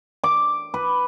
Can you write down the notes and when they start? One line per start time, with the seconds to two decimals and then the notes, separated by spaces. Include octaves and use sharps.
0.24 D6
0.74 B4